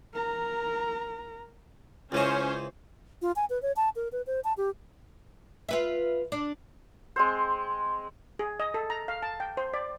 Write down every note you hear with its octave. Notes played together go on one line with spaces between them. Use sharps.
A#4 A#5
C#2 E3 C#4 C5 C#5 D#5
F4
G#5
B4
C#5
A5
A#4
B4
C5
A5
G4
F4 B4 E5
D4
G#3 C4 C5
G#4
D#5
A4
A#5
F5
A5
G5
C5
D5